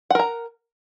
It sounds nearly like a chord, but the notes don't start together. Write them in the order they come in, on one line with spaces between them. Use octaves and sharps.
F#5 A#4 A#5